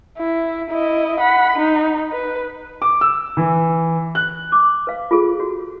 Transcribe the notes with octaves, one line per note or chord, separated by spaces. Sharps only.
E4
E4 D#5
F#5 B5
D#4
B4
D6
E6
E3
F#6
D6
B4 F5
F4 G#4 A4
F#4